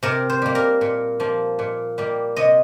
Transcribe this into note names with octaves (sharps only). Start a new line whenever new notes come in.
C3 A#4
C5
G3 A#3
A#4
A#2
F3 A#3
A#2
G3 A#3
C3 D#5